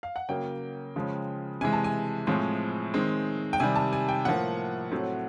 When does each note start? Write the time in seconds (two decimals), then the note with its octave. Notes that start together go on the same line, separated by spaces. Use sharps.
0.03 F5
0.16 F#5
0.29 C#3 F#3 A#3 G5
0.96 C#3 F3 G#3
1.61 C3 E3 G#3 G#5
1.73 A5
1.84 G#5
2.27 A2 F3 G#3 C4
2.94 D#3 G#3 C4
3.53 G5
3.60 C3 D#3 G3 G#5
3.75 A5
3.93 G#5
4.09 G5
4.25 A2 F3 A#3 F#5
4.92 A2 F#3 A3 C4